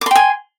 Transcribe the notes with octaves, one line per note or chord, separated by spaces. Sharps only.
G5 G#5 C6 D6